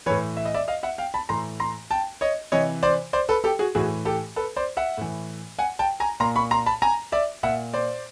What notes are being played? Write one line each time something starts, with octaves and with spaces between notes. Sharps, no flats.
A2 E3 B4 C#5
E5
D#5
D5 E5
D#5 F5
E5 F#5
F5 G5
A5 B5
A2 E3 A#5 C6
A#5 C6
G5 A5
C#5 D#5
C3 E3 C#5 D#5
C5 D5
C5 D5
A4 B4
G4 A4
F#4 G#4
A2 E3 F#4 G#4
G4 A4
A4 B4
C5 D5
E5 F#5
A2 E3
F#5 G#5
G5 A5
G#5 A#5
A#2 A#5 C6
B5 C#6
A#5 C6
A5 B5
G#5 A#5
D5 E5
A#2 E5 F#5
C5 D5